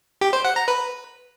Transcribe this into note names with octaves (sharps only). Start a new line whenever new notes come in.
G4
C5
F#5
A#5
B4